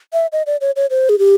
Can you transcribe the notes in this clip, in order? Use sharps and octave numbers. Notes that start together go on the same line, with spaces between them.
E5
D#5
D5
C#5
C#5
C5
G#4
G4